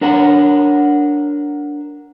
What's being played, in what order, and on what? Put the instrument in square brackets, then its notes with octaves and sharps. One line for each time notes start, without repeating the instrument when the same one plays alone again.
[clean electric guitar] D4 A#4 C#5 F#5